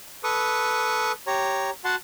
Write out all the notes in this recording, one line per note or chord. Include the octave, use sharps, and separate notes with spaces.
A4 B4 C#6 D#6
G4 C#5 A#5
F#4 F#5 A5 C6